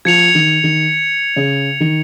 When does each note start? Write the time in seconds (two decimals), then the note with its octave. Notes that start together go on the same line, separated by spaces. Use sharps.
0.05 F3 G#6 C#7 F7
0.35 D#3
0.64 D#3
1.36 C#3
1.80 D#3